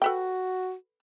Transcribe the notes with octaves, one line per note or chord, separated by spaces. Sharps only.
F#4 A4 B4 G5